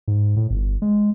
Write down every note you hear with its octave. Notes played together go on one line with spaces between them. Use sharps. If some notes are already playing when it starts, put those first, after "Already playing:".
G#2
A2
G1
G#3